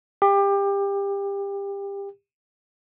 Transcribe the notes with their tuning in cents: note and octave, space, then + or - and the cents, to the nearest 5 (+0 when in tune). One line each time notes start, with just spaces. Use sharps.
G4 +25